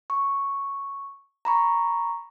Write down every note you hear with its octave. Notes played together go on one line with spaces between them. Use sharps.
C#6
A#5 B5 C#6